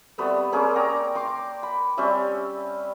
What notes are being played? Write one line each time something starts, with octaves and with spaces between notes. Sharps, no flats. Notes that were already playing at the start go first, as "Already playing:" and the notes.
G3 A3 B3 C4
A#3 C4 C#4 G#4
D5 G5 A#5 C#6
C6 D6
B5
G3 C4 C#4 E5